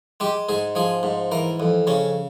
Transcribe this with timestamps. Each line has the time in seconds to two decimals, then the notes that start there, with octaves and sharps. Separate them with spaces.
0.20 G#3 G4
0.49 G#2 G#4
0.75 F3 G#4
1.03 G#2
1.32 E3 A#4
1.60 F2
1.87 C#3 C#4